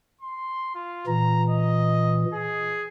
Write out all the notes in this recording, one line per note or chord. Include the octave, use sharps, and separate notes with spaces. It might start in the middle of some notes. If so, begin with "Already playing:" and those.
C6
F4
A#2 E3 A#5
D#5
G#4